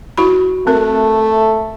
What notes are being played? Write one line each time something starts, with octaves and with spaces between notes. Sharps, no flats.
E4 F#4 B5
A3 C4 A#4